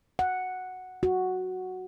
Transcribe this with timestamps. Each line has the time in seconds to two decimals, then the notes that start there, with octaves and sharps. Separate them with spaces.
0.19 F#5
1.03 F#4